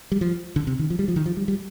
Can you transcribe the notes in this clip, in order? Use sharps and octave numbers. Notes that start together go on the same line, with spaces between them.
G3
F3
D3
C3
D#3
F3
G3
F3
D#3
F3
G3
G3